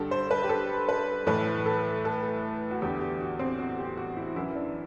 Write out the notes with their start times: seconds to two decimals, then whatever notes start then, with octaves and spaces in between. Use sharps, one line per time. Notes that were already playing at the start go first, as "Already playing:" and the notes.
Already playing: G2 D3 G4 A4
0.11 C5
0.31 B4
0.43 G4
0.49 A4
0.89 B4
1.27 A2 E3 B4
1.66 A4
2.05 A4
2.71 F#4
2.81 E2 D3 G4
3.01 G4
3.21 F#4
3.39 C4
3.59 F#4
3.78 G4
3.97 F#4
4.17 E4
4.36 F#2 E3 E4
4.55 D4